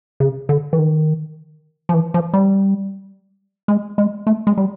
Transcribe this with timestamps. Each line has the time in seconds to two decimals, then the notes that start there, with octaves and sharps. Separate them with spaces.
0.20 C#3
0.49 D3
0.73 E3
0.79 D#3
1.89 F3
1.94 E3
2.14 F3
2.33 G3
3.68 G#3
3.98 G#3
4.27 A3
4.47 G#3
4.57 G3